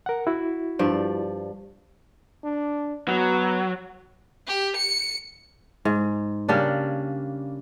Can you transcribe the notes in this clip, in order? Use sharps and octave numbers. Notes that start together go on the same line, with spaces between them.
A#4 F#5
E4 F#4
G2 F3 D5
D4
F#3 B3
G4
C#7
G#2
C#3 G3 A#3 D4